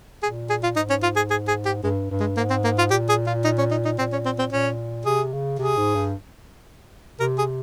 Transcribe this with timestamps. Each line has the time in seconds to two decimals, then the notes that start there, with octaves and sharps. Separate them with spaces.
0.23 A#2 G#4
0.50 G#4
0.63 F4
0.76 G#2 D#4
0.90 C#4
1.03 F4
1.16 G#4
1.30 G#4
1.48 G#4
1.65 G4
1.83 G2 G#3
2.11 G2
2.20 G#3
2.37 G#2 A#3
2.50 C4
2.64 A#3
2.78 F4
2.90 A#2 G4
3.09 G#4
3.27 F4
3.44 D#4
3.58 C#4
3.71 D#4
3.85 D#4
3.98 A#2 C4
4.12 C#4
4.25 C4
4.39 C4
4.52 A#2 C#4
5.05 C3 G#4
5.33 C#3
5.59 C3 G#4
5.77 G#2
5.95 G2
7.20 C3 A#4
7.38 G#4